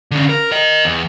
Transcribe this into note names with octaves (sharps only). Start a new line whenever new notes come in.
D3 C#4
A#4
A#4 D#5
E2